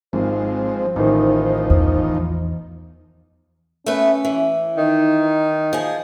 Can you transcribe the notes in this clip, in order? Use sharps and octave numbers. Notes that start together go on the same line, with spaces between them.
G#1 F3 G#3 C4 C5
A1 D#3 F3 D#4
E2
A3 B3 C#4 B4
E3
D#3 D#4
F3 G#4